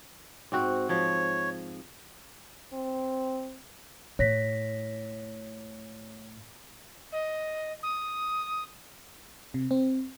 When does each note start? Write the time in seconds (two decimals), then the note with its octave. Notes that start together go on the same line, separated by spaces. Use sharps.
0.52 G#2 C4 F#4
0.89 F3 C#5
2.73 C4
4.19 A2 C#5 A#6 B6
7.12 D#5
7.83 D#6
9.54 C3
9.71 C4